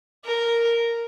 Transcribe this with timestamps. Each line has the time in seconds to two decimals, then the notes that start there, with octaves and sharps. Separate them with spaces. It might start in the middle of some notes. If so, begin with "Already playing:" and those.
0.25 A#4